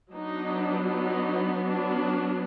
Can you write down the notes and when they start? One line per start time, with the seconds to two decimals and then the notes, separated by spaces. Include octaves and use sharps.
0.14 F#3 B3 D4 D#4
0.88 D#4
1.62 D4